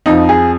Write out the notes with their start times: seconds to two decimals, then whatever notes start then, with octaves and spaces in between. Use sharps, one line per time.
0.06 F2 F3 D#4
0.29 G#4